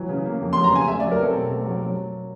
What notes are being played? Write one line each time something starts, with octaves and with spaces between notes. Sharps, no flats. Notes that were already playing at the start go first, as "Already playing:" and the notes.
Already playing: E3 F#3
C#3
A#3
F2
C6
F#3
A#5
C#3 G#5
A3 E5
D5
F#3
A#4
C4 A4
B2
A3
F#3
F#3